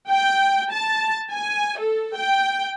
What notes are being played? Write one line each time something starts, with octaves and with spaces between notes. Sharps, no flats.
G5
A5
G#5
A4
G5